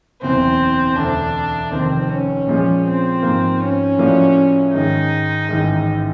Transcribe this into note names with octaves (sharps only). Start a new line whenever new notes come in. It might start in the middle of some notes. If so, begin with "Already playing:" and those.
F#1 E2 B2 C4
E1 D2 D3 D4
F1 D#2 D#3 C4
C#4
A#2 F3 G#3
C4
G#2 F3 A#3
C#4
A2 F3 A#3 D4 F#4
G#2 D#3 G#3 D#4
A1 G#2 D#3 G#3